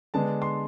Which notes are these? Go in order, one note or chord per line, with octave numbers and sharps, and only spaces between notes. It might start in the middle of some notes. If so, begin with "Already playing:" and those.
D3 G#3 B3 D4 A5
C6